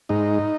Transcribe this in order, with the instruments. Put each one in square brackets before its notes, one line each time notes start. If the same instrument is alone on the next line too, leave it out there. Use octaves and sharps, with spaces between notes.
[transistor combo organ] G#2 D#4